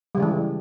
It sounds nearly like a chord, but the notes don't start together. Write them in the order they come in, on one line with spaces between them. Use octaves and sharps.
G3 C#3 G#3 E3